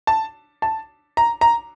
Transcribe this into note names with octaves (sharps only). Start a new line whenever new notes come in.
A5
A5
A#5
A#5